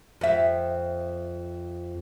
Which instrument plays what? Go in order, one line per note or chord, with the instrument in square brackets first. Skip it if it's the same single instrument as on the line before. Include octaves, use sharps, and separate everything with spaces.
[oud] F2 E5